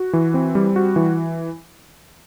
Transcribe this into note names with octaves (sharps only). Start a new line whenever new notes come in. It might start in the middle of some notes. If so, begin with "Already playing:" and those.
Already playing: F#4
E3
C4
G3
F#4
E3